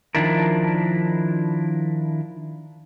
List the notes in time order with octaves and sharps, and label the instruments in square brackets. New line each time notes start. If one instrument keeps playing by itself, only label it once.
[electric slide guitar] D#3 F3 D4 E4 A#4